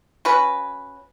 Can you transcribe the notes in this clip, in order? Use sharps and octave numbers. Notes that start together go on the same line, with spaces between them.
C#4 F#4 B4